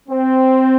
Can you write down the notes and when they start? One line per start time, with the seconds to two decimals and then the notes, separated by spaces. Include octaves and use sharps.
0.09 C4